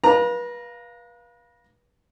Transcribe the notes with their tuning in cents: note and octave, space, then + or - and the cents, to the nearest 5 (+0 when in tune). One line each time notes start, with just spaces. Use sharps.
B4 -35 F5 +0 A#5 +0